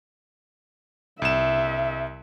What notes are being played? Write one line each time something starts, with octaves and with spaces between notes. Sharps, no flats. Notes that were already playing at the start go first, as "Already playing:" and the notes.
C2 E5 E7